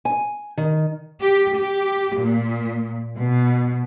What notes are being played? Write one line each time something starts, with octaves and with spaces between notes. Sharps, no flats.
G#5
D#3
G4
G4
A#2
B2